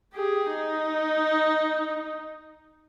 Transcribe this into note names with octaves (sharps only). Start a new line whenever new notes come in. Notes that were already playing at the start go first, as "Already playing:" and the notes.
G4 G#4
D#4